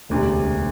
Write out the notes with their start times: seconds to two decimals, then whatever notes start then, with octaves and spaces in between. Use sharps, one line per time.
0.09 E1 D2 C3